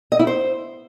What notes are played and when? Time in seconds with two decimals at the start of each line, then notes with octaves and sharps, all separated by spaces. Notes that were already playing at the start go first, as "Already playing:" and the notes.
0.12 D#5
0.19 E4
0.27 C5